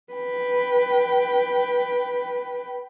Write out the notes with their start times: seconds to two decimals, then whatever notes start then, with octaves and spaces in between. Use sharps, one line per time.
0.13 B4 G5